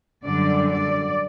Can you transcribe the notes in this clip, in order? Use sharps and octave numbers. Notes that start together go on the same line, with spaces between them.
F#2 D3 G3 D5
D5